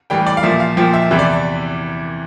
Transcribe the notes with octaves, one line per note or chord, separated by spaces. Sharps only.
A2 E3 G3 G5
D5
F5
A#2 F3 E5
F5
A#2 F3 G5
E5
E2 C3 E3 E5
D5